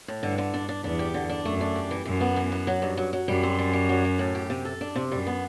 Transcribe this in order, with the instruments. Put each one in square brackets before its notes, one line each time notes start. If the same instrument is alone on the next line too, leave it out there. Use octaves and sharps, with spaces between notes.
[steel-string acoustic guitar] A2
[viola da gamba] G2 [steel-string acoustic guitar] D3
[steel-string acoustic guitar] D3
D4
D4
[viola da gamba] E2 [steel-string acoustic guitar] D4
[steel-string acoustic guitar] G4
D3
D4
[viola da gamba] F#2 [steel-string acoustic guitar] A3
[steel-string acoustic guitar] D4
G4
E3
[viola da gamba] F#2 [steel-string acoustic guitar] E3
[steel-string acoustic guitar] B3
E3
B3
F#3
G2
F#3
F#3
[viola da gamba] F#2 [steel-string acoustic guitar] G3
[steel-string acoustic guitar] C4
G3
G3
F#3
F#3
A2
G4
C3
A4
D4
C3
[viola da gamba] F#2 [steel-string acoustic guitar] G3
[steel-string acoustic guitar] B3